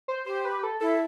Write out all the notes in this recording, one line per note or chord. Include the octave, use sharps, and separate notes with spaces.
C5
G4 C5
B4
A4
E4 A4